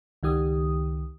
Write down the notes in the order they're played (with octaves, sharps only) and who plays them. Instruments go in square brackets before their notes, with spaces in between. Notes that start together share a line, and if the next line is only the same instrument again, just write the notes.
[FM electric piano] C#2 D#3 G4 D#6